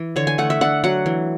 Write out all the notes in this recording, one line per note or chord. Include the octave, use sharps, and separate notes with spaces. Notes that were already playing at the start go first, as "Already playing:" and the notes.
Already playing: E3
D3 C#5
G#5
A3 F#5
E5
D4 F#5
F#3 F#5
E3